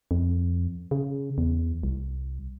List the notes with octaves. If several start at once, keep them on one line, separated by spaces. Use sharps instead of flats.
F2
C#3
E2
C2